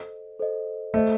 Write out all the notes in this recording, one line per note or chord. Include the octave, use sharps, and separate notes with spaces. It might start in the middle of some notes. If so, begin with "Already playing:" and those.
Already playing: A4 C5 D#5
A4 C5 D#5
A3 A4 C5 D#5